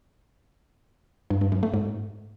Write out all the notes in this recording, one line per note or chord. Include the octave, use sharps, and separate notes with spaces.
G2
G2
F#2
A3
G#2